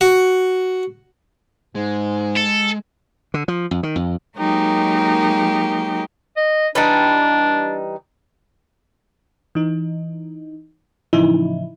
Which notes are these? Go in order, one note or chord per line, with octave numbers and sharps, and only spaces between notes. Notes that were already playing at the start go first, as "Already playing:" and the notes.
F#4
G#2 G#3
A4
D3
F3
F2
D#3
F2
F#3 G#3 A#3 D#4 G4 A#4
D#5
E3 G3 D4 D#4
E3 D#4
A2 C#3 E3 F3 D#4 E4